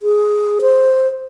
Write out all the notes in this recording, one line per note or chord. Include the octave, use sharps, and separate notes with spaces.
G#4
C5